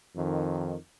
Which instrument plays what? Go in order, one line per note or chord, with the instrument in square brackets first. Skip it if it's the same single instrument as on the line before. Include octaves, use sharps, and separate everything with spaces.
[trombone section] F2 D#3